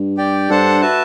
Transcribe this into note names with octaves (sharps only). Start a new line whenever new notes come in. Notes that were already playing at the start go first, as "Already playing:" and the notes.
Already playing: G2
G4 D5 G5
G2 D4 A4 C5 F#5 A5
F#4 B4 E5 A5